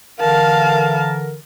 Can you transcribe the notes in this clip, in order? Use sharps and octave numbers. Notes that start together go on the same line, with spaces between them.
D3 E3 A#4 F5 A5